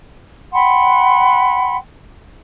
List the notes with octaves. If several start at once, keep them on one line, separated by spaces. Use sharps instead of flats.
F#5 G5 B5 C6